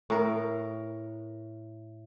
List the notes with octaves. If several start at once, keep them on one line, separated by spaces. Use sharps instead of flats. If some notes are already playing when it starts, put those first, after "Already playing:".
A2 A#4